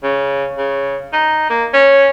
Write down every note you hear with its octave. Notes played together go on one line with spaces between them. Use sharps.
C#3
C#3
D#4
A#3
C#4